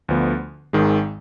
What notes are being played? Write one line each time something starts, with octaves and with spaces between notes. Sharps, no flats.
D2 D3 F3 B3
G#1 G#2 D#3 G#3